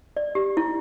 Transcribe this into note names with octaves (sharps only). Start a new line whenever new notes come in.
D5
G4
E4